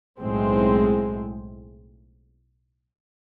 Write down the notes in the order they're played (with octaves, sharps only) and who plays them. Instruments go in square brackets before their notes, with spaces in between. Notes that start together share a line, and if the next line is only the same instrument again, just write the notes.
[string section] B1 A2 G#3 C4